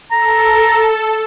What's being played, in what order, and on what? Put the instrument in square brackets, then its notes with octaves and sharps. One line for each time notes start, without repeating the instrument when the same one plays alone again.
[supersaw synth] A4 [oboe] A#5